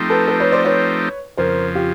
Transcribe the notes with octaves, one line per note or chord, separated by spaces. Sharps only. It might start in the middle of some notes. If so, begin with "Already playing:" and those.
Already playing: F3 A3 C4 D#4 G4
A4 B4
A4 B4
B4 C#5
C5 D5
B4 C#5
F2 C#3 F3 A#4 C5
F4 G4